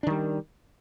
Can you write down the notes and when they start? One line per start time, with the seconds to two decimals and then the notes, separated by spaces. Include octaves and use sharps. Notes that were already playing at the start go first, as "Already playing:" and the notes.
0.03 D4
0.07 D#3
0.10 G3